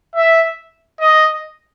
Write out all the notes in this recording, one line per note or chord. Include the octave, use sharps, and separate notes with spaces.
E5
D#5